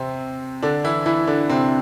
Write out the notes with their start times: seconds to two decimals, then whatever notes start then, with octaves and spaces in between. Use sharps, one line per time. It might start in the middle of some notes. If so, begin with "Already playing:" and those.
Already playing: C3 C4
0.62 D3 D4
0.84 E3 E4
1.06 E3 E4
1.27 D3 D4
1.49 C3 C4